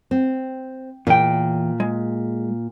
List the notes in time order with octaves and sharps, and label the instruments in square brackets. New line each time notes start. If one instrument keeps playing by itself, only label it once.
[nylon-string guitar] C4
[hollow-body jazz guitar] E2 G5 [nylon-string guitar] A#2
[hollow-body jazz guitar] G#3